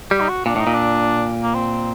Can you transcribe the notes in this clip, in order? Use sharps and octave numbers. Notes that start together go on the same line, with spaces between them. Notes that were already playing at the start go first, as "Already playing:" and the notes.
G3 G4
D#4
F#4
A#2 D4
A2 D#4
A#2
D4
A#3
C4